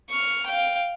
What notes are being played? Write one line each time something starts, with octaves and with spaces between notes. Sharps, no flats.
C#6 F6
F5 G5